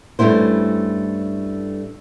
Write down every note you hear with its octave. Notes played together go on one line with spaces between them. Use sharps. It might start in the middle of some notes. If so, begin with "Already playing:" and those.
G2 A3 C#4 E4 C5